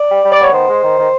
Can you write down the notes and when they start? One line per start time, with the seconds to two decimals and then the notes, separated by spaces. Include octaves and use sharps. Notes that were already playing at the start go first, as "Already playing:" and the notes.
Already playing: D5
0.09 G3
0.24 G3
0.32 D5
0.38 B3 C#5
0.53 D#3 C5
0.68 G#3
0.83 D#3
0.97 D#3